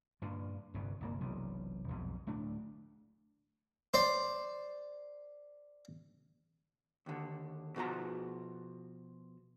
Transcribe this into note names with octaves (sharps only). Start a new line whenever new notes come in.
G2 A#2 D3
G1 C2 G2 B2
G1 C2 D3 A#3
E1 B1 C3
B1 F2 G#2 B2
D1 A3 D4
C5 D5
D#2 D3
B2 F3 F#4 D5 A#5